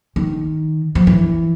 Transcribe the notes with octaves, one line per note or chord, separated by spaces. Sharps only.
D#3
F3
E3